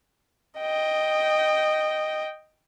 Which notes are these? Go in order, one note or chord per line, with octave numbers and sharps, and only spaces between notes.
D#5 G5